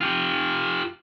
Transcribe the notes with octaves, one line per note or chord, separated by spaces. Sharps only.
F4 G4